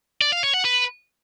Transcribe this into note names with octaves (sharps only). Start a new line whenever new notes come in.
D5
F5
C#5
F#5
B4